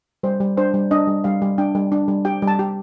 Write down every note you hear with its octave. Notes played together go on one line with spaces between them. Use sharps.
G3 C5
G3
D4 C5
G3
D4 D#5
G3
G3 F5
G3
D4 G5
G3
D4
G3
G4 G5
G3
A5
G4